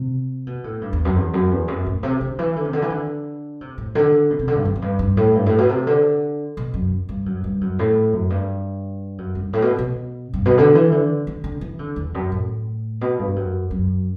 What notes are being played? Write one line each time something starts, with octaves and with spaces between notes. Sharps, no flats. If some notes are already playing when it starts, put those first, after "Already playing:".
Already playing: C3
B2
A2
G2
E2
F#2
E2
F#2
E2
F#2
A2
C3
D3
E3
D3
C3
D3
E3
D3
C3
A2
D3
B2
C3
D3
G2
F#2
F#2
G2
G2
A2
G2
A2
B2
C3
D3
B2
F#2
G2
F#2
G2
F#2
A2
F#2
G2
F#2
G2
A2
B2
B2
G2
B2
D3
E3
D3
D3
D3
E3
D3
E2
F#2
A2
B2
G2
F#2
F#2